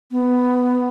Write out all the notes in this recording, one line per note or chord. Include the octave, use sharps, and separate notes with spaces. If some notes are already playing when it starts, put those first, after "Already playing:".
B3